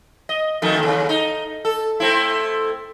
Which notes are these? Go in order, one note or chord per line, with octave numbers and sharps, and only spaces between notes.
D#5
F2 D#3 A3
D#2 C#3
D#4
A4
A3 C4 E4